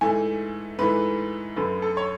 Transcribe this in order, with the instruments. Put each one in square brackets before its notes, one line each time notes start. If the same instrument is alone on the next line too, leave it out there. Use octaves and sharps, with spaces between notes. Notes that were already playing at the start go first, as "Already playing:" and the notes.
[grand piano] G#2 E3 A3 G#5
G#2 E3 A3 B4
F#2 D3 A3 B4
A4
C#5